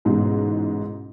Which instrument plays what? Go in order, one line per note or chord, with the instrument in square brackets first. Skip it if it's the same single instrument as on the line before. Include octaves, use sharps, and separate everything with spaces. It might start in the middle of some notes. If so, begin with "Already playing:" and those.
[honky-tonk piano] A1 G#2 B2 G#3